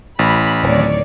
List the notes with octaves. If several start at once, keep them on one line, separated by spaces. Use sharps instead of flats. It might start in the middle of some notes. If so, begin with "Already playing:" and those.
A1 B5
D1 D#3 C#5 D5